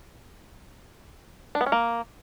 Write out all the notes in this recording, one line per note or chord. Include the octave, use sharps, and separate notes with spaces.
D4
B3
C#4
A#3